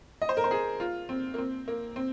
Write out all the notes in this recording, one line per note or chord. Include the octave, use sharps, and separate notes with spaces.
D#5
C5
A#4
C5
G#4
F4
C4
A#3
C4
A#3
C4